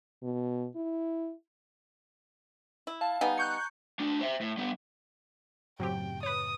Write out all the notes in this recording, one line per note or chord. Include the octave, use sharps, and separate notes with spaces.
B2
E4
E4
F5 A5
G3 B3 D#4 G#5
A#5 C#6 F#6 G6 C#7
A3 D4
C5 E5
A2
G3 B3
F#2 A2 C#3 F#3 C4 G4 G5
B4 C#5 D#6